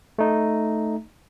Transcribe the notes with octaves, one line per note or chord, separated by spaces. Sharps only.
A3 D#4